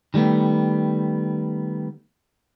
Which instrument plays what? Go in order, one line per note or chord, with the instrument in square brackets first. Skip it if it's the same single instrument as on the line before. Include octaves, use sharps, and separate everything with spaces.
[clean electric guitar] D#3 G3 A3 B3